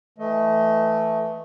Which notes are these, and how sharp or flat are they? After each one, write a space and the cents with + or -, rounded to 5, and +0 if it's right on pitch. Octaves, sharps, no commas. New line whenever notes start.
E3 +0 A3 +0 D#5 +20